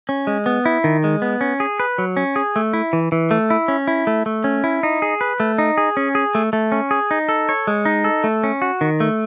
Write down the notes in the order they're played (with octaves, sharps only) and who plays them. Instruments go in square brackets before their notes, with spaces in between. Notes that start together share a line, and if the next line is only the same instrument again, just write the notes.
[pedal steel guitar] C#4
G#3
B3
E4
D#3
G#3
B3
C#4
G#4
B4
F#3
C#4
G#4
A3
E4
E3
E3
A3
E4
C#4
E4
A3
A3
C#4
E4
D#4
G#4
B4
A3
D#4
G#4
C#4
G#4
A3
A3
C#4
G#4
D#4
A4
C#5
G#3
D#4
A4
A3
C#4
F#4
D#3
A3